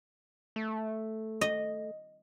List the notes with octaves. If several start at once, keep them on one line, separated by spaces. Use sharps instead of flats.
A3
D#5